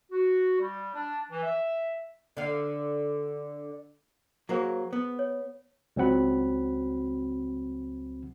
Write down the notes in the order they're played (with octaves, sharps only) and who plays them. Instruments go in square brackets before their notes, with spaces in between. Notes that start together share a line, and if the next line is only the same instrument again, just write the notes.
[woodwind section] F#4
G3
D4
E3
E5
[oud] D3 F5
[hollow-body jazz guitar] F#3 A#3 [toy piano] G#4 C5 F#5
[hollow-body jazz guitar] B3
[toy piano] C#5
[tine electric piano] C#2 F#3 C4 F#5 B5